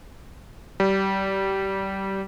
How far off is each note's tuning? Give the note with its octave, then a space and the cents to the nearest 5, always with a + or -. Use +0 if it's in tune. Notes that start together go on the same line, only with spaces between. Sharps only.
G3 -20